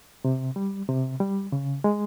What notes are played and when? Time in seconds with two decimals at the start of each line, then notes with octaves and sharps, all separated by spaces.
0.25 C3
0.56 G3
0.89 C3
1.20 G3
1.52 C#3
1.84 G#3